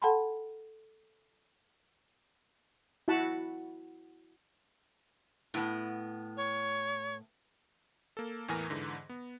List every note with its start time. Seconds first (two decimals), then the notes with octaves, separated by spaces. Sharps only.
0.02 A4 F#5 G5 A5 B5 C6
3.08 E4 F#4 F#5 A5 B5
5.54 A2 B3
6.37 C#5
8.17 A#3 A4
8.48 E2 A2 E3 A#4 G#5 A#6
8.70 G#2 D3 E3
9.09 B3